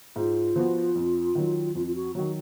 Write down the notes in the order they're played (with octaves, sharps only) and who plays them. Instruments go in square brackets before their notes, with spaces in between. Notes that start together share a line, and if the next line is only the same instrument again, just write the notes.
[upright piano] G#2 [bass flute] F4
[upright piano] F3 B3 F#4
F2
D#3 F#3
[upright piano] F2 [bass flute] F4
[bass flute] F4
F#4
[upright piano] D#3 F#3 [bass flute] F#4